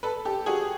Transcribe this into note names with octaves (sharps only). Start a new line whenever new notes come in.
A4 B4
G4 A4
F#4 G#4